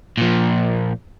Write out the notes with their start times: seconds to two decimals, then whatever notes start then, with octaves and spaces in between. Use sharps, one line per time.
0.18 A#2 F3